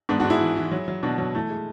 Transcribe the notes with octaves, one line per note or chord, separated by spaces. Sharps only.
G#2 B3 D4
G#2 D4 F#4
E4 G#4
E3
E3
F#3
F#3
B2 D4 F#4
F#3
E3 A3
G#3